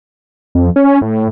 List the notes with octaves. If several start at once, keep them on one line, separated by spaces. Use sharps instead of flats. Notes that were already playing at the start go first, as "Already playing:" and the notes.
F2
C#4
A2